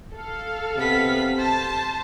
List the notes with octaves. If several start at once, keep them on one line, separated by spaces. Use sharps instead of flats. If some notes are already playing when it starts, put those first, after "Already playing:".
A4 F5
C3 B3 B6
C5 A5